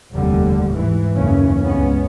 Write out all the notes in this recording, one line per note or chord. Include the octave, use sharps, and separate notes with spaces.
F1 D#2 D3 G3
G#2 E3
F#1 D#2 C#3 E3 C#4
C#2 G2 G#3 B3 C#4